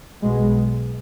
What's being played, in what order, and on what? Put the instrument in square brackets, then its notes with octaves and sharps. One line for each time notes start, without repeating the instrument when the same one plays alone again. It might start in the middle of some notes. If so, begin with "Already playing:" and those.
[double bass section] B1 B2 G#3